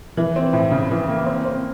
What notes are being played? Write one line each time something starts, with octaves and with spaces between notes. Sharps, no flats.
E3
C4
A2
C#3
E3
A#3
C4
C4